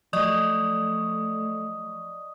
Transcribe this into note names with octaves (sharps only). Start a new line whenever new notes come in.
F3 F#3 A3 D5 D#5 C#6 D#6